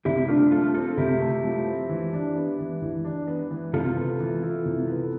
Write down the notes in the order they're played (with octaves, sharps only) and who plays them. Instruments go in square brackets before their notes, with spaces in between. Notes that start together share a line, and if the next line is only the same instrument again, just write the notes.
[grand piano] C3 [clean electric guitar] E4 G4
[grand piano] A3 [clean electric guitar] D4 F4
[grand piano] F3 [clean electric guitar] F4 A4
[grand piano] C4 [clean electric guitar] F4 A4
[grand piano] C3 [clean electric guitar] E4 G4
[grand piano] A3
F3
C4
E3
D4
B3
E3
E3
D4
B3
E3
[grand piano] C3 [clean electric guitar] F4 A4
[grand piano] B3
E3
E4
C3
B3